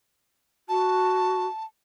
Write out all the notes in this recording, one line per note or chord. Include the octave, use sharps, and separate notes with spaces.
F#4 A5